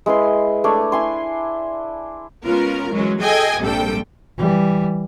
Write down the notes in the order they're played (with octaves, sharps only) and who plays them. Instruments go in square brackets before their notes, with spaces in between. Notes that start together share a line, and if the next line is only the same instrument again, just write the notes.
[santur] G#3 E4 B4 C6
A3 D4 C#5
E4 G#5 C6
[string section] G#3 B3 C#4 F4 A#4
E3 F#3 G#3 C#4
G#4 A4 D#5 G5 G#5 G#6
A#1 G#2 C3 G3 A4 G5
[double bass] E3 G3